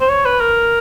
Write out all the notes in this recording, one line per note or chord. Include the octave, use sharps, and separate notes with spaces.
C5
C#5
B4
A#4